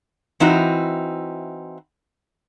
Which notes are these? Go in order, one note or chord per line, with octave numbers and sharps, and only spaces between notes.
E3 C4 D#4 E4 F#4